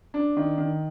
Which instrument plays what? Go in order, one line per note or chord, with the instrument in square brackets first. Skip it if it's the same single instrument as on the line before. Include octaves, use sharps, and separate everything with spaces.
[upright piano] D4
D#3
D#3